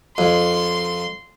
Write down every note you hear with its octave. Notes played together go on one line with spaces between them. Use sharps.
F2 C6